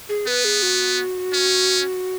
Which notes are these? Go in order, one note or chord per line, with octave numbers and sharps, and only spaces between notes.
G#4
B3 B4
G#4
F#4
C#4